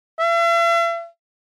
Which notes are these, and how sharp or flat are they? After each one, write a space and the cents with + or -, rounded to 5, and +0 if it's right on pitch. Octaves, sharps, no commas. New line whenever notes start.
E5 +45